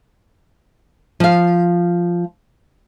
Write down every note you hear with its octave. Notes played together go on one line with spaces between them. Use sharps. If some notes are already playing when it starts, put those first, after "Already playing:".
F3 F5